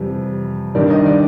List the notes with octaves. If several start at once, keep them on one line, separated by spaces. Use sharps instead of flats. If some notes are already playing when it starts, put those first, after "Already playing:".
Already playing: F2 C3 E3 G3
G2 D#3 G3 D5
D#5
D5